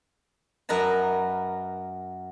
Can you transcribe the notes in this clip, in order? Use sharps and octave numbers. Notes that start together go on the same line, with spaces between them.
F#2 A#4 B4 D#5 A5